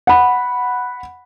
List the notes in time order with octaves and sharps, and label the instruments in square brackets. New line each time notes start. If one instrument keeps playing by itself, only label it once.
[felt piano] F#5 B5